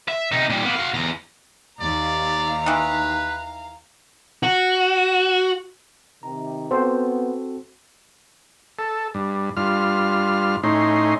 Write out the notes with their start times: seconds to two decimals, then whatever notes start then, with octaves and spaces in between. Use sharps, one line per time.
0.08 E5
0.32 C3 D#4
0.50 A#2 G3
0.63 A#3 B3
0.76 F#4 F5
0.94 E2 A#5
1.80 D#2 D5 F5 A#5
2.66 D#3 E3 B4
4.43 F#4
6.23 C3 D#3 A#5
6.71 B3 C4 F#4 A4 C5
8.79 A4
9.14 G2
9.57 G2 F4 F6
10.63 A2 C#4 D#4 C6